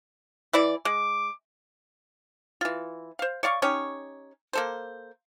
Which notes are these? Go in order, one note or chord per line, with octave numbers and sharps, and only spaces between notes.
E3 E4 D5
G#3 D6
E3 F4
C5 F5
C#5 D5 F5 C#6
C#4 D#4 G4 C#5
A#3 A4 C5